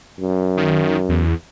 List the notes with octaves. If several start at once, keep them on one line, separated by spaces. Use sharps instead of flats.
F#2
D#3
E2